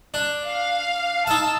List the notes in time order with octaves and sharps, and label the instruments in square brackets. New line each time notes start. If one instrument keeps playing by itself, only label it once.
[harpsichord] D4
[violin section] F5
[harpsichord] D#4 F5 [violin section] A5 E6